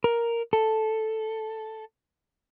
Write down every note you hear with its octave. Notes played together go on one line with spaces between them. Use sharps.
A#4
A4